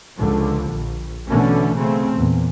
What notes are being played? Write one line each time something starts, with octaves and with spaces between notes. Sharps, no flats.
C#2 D3 F3
A#1
B2 D3 E3 A3 C#4
C#3 A3 C4
E2 A#2